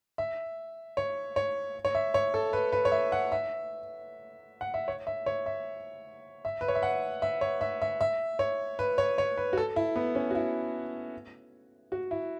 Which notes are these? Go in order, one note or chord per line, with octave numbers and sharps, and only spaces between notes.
E5
C#5
C#5
C#5
E5
C#5
A4
B4
B4
C#5
E5
F#5
E5
F#5
E5
C#5
E5
C#5
E5
E5
B4
C#5
E5
F#5
E5
C#5
E5
E5
E5
C#5
B4
C#5
C#5
B4
F#4
A4
E4
B3
C#4
F#4
E4
F#4
E4